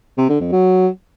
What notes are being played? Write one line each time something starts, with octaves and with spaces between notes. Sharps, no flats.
C3
D3
F2
F#3